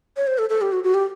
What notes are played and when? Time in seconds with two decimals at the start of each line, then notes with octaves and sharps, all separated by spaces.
0.17 C#5
0.27 C5
0.38 A4
0.50 A4
0.61 G4
0.72 F#4
0.84 F#4
0.94 G4